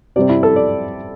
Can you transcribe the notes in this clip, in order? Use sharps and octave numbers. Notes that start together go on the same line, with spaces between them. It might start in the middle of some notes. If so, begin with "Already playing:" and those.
C3 G3 C4 D5
E4
A4
D5